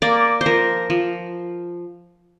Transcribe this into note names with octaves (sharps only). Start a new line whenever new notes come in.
A#3 D5
C5
F3 A#4
F3